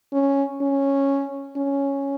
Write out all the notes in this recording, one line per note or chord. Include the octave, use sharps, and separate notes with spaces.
C#4
C#4
C#4